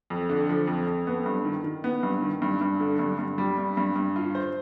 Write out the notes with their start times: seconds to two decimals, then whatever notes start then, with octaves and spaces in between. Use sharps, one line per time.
0.10 F2
0.29 D3
0.49 F3
0.67 F2
0.87 F2
1.07 B3
1.26 G2
1.45 D#3
1.64 D#3
1.84 B3
2.03 G2
2.22 D#3
2.42 G2
2.61 G2
2.80 D3
2.99 G2
3.19 G2
3.38 G3
3.58 G2
3.77 G2
3.96 G2
4.16 F4
4.35 C5